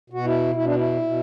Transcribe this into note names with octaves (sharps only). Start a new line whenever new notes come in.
B2 F#4
E4
B2 E4
D4
E4
B2